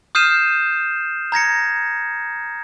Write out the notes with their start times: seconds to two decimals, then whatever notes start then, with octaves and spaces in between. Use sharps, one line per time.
0.15 D#6 F6 G6 C7 D#7 E7
1.32 A#5 G#6 A#6 C#7